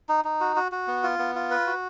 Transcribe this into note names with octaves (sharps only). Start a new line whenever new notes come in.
D#4
D#4
F#4
F#4
F#4
B3
F4
B3
F4
B4
F#4